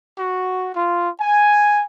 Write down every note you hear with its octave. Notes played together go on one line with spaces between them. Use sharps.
F#4
F4
G#5